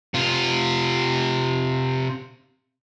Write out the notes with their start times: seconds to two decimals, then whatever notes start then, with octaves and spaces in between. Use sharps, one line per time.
0.14 C3 F4